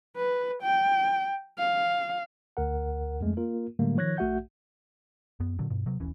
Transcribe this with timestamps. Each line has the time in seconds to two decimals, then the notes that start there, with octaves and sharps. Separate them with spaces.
0.17 B4
0.63 G5
1.58 F5
2.57 D2 A#4 F#5
3.21 F2 G#3 A3
3.37 A#3 F4 A#4
3.79 A2 D3 F#3 G3 A3 A#3
3.97 D#3 F3 C#5 F#6 G#6 A#6
4.17 A#1 A3 F#4 E5 F#5 G6
5.40 F#2 B3
5.59 A#2 D3 F#3
5.70 G2 B2
5.86 C3 F#3
6.00 D#1 A#1 E3 C#4